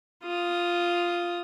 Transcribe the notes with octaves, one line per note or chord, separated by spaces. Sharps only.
F4 D#6